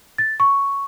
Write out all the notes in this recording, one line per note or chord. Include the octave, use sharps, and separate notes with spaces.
A6
C#6